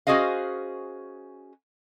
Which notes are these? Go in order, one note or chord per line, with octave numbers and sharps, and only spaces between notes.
C#4 F#4 G#4 C5 D#5 F5